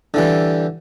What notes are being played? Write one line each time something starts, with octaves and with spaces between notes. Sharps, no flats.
D3 E3 G3